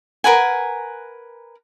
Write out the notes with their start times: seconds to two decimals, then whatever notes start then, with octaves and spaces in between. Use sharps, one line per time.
0.24 A#4 B4 F#5 G#5